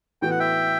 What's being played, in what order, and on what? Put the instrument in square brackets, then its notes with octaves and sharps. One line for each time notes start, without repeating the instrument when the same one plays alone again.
[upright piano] A2 E3 B3 F#4 [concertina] G5
[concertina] F#5
E5 G5